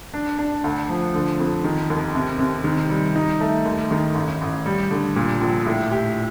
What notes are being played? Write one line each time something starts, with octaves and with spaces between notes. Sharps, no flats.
D4
D4
D2
F3
D3
F2
D#3
D#2
C3
C3
D#3
G3
D#4
A3
D#2
D#3
A1
A1
G3
D3
A#2
A#1
A2
G4